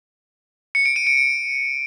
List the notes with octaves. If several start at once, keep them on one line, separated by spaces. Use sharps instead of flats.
C#7
D7
D#7
D7
D7